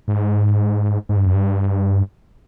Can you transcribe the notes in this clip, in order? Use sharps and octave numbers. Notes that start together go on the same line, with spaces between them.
G#2
G#2
G2
F#2
G2